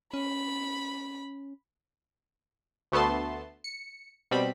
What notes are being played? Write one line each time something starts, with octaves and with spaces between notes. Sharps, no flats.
C#4 B5
D2 A3 B3 A5 C6
C#7
B2 G3 C4 B5